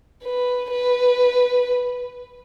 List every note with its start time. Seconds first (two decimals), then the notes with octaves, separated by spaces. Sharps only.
0.23 B4
0.71 B4